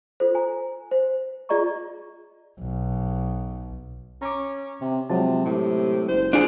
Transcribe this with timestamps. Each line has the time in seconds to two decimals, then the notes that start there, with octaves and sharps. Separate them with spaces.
0.20 F4 A4 C5
0.35 C5 G#5 A#5
0.91 C5
1.49 F4 G#4 D5 D#5 A#5 C#6
2.60 B1
4.22 C#4 A#5 D6
4.81 C3
5.10 C3 F3 F#3 G#3 A5
5.45 A2 C3
6.09 F#1 C5
6.33 D4 F4 G#4